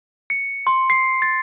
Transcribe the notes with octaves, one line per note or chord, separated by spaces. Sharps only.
C#7
C6
C7
A6